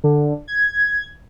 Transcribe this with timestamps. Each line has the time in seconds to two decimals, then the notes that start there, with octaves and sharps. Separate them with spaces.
0.04 D3
0.48 G#6